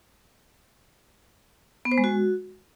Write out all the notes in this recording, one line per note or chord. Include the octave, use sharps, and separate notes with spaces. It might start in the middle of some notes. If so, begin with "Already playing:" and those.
B3
C5
G#3
F#4